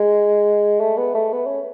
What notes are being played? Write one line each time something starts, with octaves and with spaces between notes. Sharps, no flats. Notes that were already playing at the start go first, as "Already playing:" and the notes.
Already playing: G#3
A3
B3
A3
B3
C#4